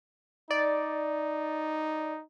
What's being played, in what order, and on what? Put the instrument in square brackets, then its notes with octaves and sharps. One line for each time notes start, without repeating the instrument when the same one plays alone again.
[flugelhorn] D#4 [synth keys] D5